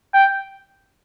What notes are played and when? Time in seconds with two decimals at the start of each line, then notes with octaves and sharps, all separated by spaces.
0.14 G5